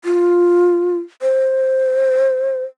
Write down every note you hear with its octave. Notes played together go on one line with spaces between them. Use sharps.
F4
C5